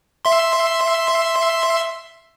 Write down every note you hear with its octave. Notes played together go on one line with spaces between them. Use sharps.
E5 C6